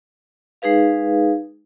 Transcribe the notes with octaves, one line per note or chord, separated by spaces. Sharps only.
G#3 D#4 G#4 B4 F5